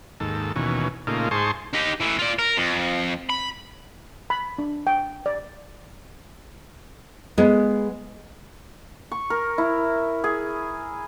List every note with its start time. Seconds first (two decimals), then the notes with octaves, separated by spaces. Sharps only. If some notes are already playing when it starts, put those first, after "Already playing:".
0.20 D#2 G#2 A4
0.56 D#2 B2 E3 C#4
1.07 A#2 C#3 A3 A#3 D#4 F4
1.31 G#2 G#4 C5 A5 C6 C#6
1.73 D#4 G4
2.00 E3 A3
2.19 F4 D5
2.39 A#4
2.57 F2
3.30 B5
4.30 B5
4.58 D4
4.87 G5
5.26 D5
7.37 G#3 B3
9.12 C#6
9.30 A#4
9.58 E4
10.24 G#4